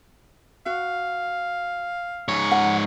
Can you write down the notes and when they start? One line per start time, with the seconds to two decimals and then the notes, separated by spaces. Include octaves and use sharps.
0.66 F#4 F5
2.28 G#2 C#5
2.51 F#5